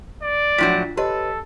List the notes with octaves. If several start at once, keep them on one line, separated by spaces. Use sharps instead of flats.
D5
A2 F3 F#3 D4 F4 B6
G4 A4 B4 C#5 D#5